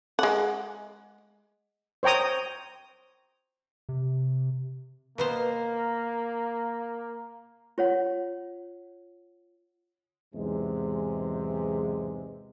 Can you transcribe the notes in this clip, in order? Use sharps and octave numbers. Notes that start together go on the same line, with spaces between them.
G#3 F#5
C5 C#5 G5 A#5 D#6
C3
B2 A#3 B3 C5
F4 C#5 F#5
B1 E2 G#2 C3 G#3